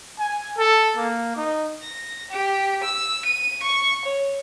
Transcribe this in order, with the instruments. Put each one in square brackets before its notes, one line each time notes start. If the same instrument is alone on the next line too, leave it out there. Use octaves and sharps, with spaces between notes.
[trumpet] G#5
A4
A#3
D#4
[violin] A#6
G4
E6
D#7
C#6
C#5